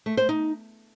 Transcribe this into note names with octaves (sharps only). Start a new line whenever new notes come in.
A3
C5
D#4